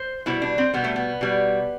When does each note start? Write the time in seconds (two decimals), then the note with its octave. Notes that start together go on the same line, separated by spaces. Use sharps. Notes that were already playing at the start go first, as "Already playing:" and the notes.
Already playing: C5
0.26 B2 G3 E4
0.42 D4
0.58 C4
0.74 B2 G3 B3
0.84 A3
0.96 B3
1.21 B2 G3